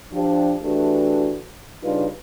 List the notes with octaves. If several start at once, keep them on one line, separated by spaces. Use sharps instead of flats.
F3 D4 G4
E3 A3 D4 F#4 G4 B4
C#3 G3 D4 D#4 F4 B4